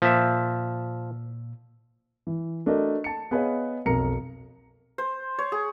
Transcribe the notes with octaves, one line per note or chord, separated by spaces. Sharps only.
A#2 F3 E5 E6
E3
A3 D4 F#4 A#4 D#5
A5 C#7
B3 G#4 B4 C#5 D#5 F5
B1 F2 A#4 A#5 C#7
C5
C#5
G#4